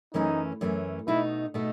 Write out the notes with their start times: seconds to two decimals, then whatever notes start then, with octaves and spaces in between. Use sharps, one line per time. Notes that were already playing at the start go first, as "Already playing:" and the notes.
0.14 F#2 E3 A3 C#4 D#4
0.61 F#2 E3 A3 C#4
1.08 B2 A3 D#4 E4
1.54 B2 A3 D#4